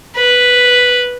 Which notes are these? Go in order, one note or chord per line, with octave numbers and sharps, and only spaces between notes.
B4